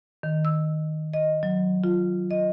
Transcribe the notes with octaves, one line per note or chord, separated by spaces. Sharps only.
D#3
E6
D#5
F#3
F4
D#5